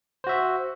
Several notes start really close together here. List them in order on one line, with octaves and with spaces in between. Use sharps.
C5 F#4 E5